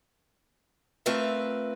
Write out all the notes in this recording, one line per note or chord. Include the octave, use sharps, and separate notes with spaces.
A3 C4 F4 A#4 B4 E5